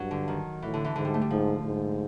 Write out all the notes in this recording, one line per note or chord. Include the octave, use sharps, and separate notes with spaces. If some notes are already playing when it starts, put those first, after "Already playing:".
Already playing: G2 F#3
D3
D#3
A2 E3
D3
E3
G#2 D3
G3
A3
G3
G#2 F3
G#2